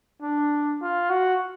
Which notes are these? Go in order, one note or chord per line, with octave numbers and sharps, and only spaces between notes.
D4
F4
F#4